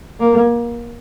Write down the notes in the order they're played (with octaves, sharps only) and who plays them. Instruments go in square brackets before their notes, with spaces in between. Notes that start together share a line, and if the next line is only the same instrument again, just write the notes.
[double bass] A#3